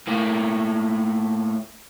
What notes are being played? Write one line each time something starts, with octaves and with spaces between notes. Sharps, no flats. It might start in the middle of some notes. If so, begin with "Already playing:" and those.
A2 A#3